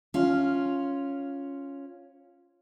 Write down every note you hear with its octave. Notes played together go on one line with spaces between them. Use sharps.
C#4 F4